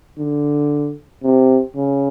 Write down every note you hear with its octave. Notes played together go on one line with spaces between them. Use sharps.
D3
C3
C#3